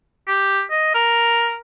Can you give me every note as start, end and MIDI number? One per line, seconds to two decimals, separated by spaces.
0.28 0.62 67
0.71 0.94 75
0.95 1.57 70